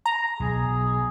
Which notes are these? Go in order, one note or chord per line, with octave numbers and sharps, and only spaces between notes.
A#5
B1 G#4